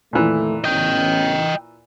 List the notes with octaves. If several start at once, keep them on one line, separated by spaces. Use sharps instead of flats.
F2 A#2 D#3 E3 A3
A1 B3 C#4 D#5 G5